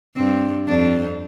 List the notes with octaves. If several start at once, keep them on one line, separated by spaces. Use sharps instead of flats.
G2 C4
F2 D4